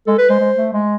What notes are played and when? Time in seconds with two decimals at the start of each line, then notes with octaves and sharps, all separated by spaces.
0.07 G#3 A4
0.18 B4
0.29 G#3 C5
0.40 G#3
0.57 A3
0.73 G#3